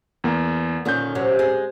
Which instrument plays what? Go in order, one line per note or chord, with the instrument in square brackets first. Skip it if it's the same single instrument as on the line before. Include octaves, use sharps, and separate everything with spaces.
[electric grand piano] E2 A#3
[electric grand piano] A#2 C#4 G6 [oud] D3 D#3
[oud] C3 F#3
G#3